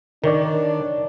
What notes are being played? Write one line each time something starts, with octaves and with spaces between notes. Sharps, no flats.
D#3 D4 A#4 C#5 D5